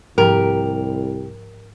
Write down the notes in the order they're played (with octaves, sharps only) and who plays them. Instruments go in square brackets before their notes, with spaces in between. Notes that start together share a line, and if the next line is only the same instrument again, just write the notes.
[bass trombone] C2 [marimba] G#2 F3 G5 [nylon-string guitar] G4 [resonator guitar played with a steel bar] A#4